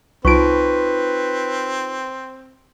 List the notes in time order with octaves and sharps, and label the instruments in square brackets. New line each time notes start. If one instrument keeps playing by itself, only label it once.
[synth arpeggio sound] C2 D7 [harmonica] C4 [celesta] D#4 F4 C#6 [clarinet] B4